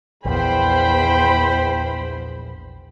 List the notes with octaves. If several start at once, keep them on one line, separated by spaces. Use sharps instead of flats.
A#1 E2 C5 G5 B5